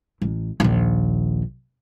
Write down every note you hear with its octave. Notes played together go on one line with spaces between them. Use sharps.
A1
A#1 D#2